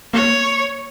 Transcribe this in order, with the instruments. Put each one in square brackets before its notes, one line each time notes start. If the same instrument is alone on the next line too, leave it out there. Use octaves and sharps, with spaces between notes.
[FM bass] A#3 [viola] C#5